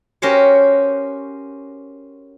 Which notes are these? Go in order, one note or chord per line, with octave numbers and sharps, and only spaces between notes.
C#4 F#4 G4 A#4 C5 C#5